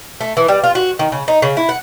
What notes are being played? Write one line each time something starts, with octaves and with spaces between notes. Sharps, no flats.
A3
E3
G3
F4
F#4
D#3
C#3
D#4
C#3
E4
F#5